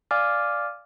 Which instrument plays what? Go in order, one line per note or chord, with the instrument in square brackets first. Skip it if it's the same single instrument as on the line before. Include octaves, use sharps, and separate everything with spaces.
[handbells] D5 F5 G#5 D6 F6